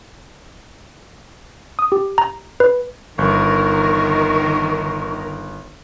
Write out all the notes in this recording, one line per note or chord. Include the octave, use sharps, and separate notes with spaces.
D#6
G4
A#5
B4
G1 D#3 A#4 C#6